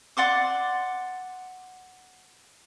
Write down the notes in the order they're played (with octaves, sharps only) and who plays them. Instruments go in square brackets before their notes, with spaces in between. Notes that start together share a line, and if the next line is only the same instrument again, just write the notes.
[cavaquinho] D5 F#5 C6 D6